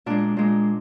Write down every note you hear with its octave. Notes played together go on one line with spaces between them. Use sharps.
A#2 G#3 D4
A#2 G#3